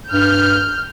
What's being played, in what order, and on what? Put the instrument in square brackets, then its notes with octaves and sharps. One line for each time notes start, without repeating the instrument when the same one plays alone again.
[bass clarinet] G2 [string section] F6 G6